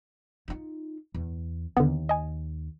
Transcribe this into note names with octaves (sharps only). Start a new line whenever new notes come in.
D#4 F4
E2
D#2 D3 B3
D#5 G#5